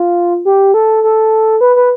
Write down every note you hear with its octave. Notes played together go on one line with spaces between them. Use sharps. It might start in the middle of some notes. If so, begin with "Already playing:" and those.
Already playing: F4
G4
A4
A4
B4
B4